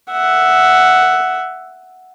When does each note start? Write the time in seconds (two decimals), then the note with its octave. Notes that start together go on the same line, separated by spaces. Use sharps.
0.12 E5 F#5